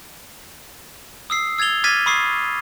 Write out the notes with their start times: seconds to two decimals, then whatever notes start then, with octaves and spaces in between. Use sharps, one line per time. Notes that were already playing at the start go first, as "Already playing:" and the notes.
1.30 D#6 E6 C7
1.58 E6 G#6 A6 F7 G7
1.84 D6 F6 G#6 A6 B6 D#7
2.06 B5 C#6 D#6 C7